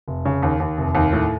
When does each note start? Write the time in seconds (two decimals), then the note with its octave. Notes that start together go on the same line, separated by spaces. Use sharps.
0.08 F1
0.25 C#3
0.43 D#2
0.60 D#2
0.78 F1
0.95 D#2
1.13 A2